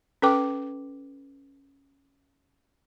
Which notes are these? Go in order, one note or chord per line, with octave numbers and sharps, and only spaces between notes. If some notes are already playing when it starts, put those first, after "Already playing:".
C#4 A4 B4 G5 D6